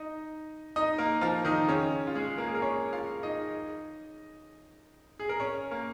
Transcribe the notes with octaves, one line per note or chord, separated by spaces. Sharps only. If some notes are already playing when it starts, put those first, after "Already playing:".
Already playing: D#4 D#5
D#4 D#5
A#3 A#4
F3 F4
D#3 D#4
C#3 C#4
F4
G#3 G#4
A#3 A#4
G#4
A#4
C#4 C#5
F4 F5
D#4 D#5
G#4
A#4
C#4 C#5
A#3 A#4